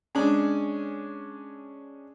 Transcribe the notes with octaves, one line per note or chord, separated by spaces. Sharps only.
G#3 C#4 D4